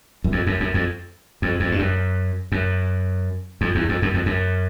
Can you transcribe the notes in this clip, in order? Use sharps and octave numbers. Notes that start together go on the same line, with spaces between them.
F#2
F2
F#2
F#2
F2
F2
F2
G2
F#2
F#2
F2
E2
F2
F#2
F2
F#2